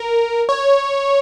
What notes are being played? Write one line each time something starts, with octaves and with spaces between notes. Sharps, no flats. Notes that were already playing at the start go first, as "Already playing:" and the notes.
Already playing: A#4
C#5